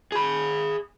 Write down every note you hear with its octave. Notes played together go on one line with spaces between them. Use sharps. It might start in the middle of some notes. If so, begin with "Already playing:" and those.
G#4 B5